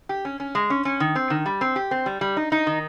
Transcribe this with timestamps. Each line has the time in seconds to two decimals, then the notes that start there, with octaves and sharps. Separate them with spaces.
0.09 G4
0.25 C#4
0.40 C#4
0.55 G#3
0.70 C#4
0.85 C#4
1.00 D#3
1.15 C4
1.30 D#3
1.46 G3
1.61 C4
1.76 G4
1.91 C4
2.06 G3
2.21 G3
2.37 D#4
2.52 D#4
2.67 D#3